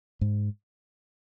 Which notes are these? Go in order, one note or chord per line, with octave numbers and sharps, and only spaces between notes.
G#2